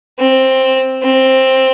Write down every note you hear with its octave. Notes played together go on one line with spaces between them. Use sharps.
C4
C4